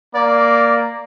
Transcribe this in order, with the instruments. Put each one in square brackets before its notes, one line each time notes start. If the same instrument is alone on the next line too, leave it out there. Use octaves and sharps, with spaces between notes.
[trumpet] A#3 [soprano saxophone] D5